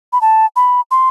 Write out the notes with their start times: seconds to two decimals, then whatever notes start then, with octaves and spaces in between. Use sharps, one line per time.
0.13 B5
0.21 A5
0.56 B5
0.91 C6